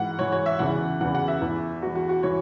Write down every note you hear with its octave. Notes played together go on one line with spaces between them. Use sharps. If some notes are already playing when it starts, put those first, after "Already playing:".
Already playing: G#2 E3 F#5
G#2 E3 C#5
C#5
E5
E2 C#3 E3 F#5
E2 C#3 E3 F#5
F#5
E5
E2 E3
E2 E3 F#4
F#4
F#4
E3 C#5